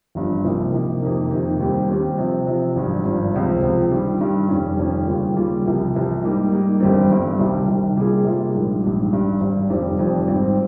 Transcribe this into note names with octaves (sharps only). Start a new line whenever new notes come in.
G1 G2 F3
C2 C3 F3 A#3 D#4
C2 C3 F3 A#3 D#4
F2 C3 D#3 A#3 D#4
F2 C3 D#3 A#3 D#4
D#2 D#3 G3 C4 G4
D#2 D#3 G3 C4 G4
C3 F3 C4
C3 F3 C4
G#1 G2 F3
G#1 G2 F3
C#2 C3 F3 C4
C#2 C3 F3 C4
G2 D#3 G3
G2 D#3 G3
F1 F2 D#3 G3 C#4
F1 F2 D#3 G3 C#4
D#2 C#3 G3 A#3 F4
D#2 C#3 G3 A#3 F4
C2 C3 F3
C2 C3 F3
G#2 G3 A#3 D#4
G#2 G3 A#3 D#4
G1 G2 G3 C4
G1 G2 G3 C4
C2 C3 D#3 G3
C2 C3 D#3 G3
C3 G3 A#3 F4 G#4
C3 G3 A#3 F4 G#4
A#1 G#2 G3
A#1 G#2 G3
G#1 G2 G3
G#1 G2 G3
F1 F2 D#3 G3 C4
F1 F2 D#3 G3 C4
G#1 G#2 G3 C4